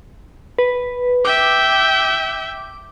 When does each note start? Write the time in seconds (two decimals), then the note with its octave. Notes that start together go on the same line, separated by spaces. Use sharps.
0.59 B4
1.25 E5 G5 D6